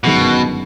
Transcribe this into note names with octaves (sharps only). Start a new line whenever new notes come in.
G1 F#2 B2 D#3 G#3 B3